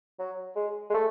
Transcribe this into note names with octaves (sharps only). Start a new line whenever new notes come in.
F#3
G#3
G#3
A3